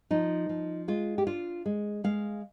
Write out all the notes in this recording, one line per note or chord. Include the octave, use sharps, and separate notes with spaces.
F3 D#4
F3
G#3 F4
G4
D4 F4
G#3
G#3 F5